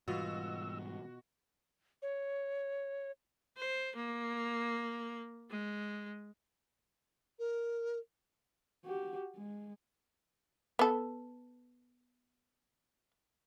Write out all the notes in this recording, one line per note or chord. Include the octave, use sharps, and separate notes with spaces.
G#2 B2 E3 G3 F4 F#4 D#5 E6
C#5
C5
A#3
G#3
A#4
F#4 G4
G#3
B3 A4